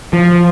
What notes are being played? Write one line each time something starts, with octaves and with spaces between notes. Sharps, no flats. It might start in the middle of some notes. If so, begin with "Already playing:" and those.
F3